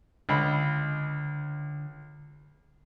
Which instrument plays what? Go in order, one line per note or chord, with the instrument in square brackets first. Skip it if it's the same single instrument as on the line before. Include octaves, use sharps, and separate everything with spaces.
[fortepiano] C#2 D#5 B5 [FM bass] D3